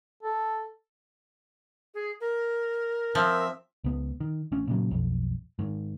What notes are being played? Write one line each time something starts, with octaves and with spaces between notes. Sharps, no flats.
A4
G#4
A#4
F3 C4 E5
C#2 B3
D#3
A1 C#4
A#2 C#3 F#3
B1 F2
G#2 D#3